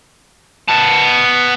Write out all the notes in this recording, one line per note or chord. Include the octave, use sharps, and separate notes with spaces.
B3 A5